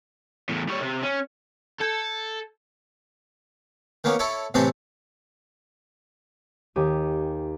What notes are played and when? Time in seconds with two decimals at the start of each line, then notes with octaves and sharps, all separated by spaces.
0.49 E2 A2
0.68 G3 C#5
0.81 C3
1.03 C#4
1.81 A4 G6 G#6 C#7
4.04 D#3 A#3 B3 C#4
4.19 E4 A4 C#5
4.54 A2 C3 E3 C4 A4 C5
6.76 D#2 D#4 G4 G#5 D6 D#7